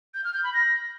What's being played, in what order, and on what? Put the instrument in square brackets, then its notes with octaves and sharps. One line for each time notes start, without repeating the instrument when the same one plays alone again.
[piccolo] G6
F6
G6
B5
A#6